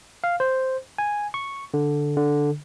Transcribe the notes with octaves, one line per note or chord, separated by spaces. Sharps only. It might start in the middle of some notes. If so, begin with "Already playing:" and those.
F5
C5
G#5
C#6
D3
D3